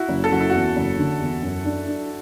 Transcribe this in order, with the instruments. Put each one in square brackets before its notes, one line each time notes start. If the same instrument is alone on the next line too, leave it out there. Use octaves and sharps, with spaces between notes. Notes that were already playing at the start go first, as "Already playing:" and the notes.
Already playing: [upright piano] E4 F#4
[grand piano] F#1
[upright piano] A4
[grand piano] F#1 [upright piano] F#4
[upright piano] E4
[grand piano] E2 [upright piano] F#4
[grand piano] F#1
D3
E2
F#2
D4
D4